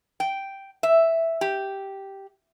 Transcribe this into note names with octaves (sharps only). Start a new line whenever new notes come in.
G5
E5
G4